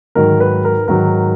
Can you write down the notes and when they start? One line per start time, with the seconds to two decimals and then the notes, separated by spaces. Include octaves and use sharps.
0.15 G#2 D#3 F#3 A#4
0.40 B4
0.65 A#4
0.88 G#2 D#3 F#3 A#4